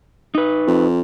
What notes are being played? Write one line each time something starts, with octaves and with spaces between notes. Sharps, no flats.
D#4 B4
F2